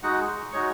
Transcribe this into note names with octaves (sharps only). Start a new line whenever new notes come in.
G#3 D#4 F#4 F#5
G#3 D#4 F#4 C#5 C#6